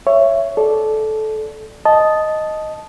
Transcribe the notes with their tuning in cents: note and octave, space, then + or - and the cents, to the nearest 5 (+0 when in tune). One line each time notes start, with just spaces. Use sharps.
C#5 +0 E5 +20
A4 -15 D5 +0
D#5 +0 A5 -10